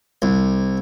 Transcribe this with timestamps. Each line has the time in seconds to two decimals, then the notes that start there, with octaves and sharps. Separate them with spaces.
0.22 C2